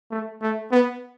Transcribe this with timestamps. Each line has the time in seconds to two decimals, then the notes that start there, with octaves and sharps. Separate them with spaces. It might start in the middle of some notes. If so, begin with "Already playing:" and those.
0.11 A3
0.42 A3
0.71 B3